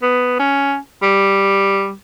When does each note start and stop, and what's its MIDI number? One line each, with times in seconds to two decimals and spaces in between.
0.02 0.35 59
0.39 0.78 61
1.02 1.93 55